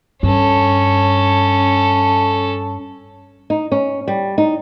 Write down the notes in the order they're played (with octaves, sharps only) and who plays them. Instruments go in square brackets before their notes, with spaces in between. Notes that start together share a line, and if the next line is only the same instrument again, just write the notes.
[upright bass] G2 [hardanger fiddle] C#4 A4
[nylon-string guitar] D#4
C#4
G3
D#4